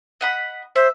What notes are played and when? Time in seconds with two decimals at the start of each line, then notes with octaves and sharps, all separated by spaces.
0.21 D#5 F#5 B5
0.76 C5 E5